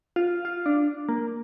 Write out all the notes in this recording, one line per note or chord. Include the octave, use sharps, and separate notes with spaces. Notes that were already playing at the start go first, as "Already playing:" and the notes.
F4
F4
D4
A#3